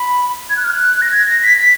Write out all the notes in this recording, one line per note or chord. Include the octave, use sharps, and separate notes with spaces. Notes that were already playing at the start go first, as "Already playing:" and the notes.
Already playing: B5
G#6
F#6
F6
F#6
A#6
G#6
A#6
B6
B6